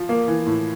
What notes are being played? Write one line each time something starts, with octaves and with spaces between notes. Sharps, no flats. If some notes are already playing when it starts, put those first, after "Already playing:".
Already playing: F3
A#3
E3
A2